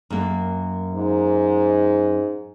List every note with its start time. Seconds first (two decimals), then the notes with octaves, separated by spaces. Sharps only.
0.10 F#2 A#3
0.95 G#2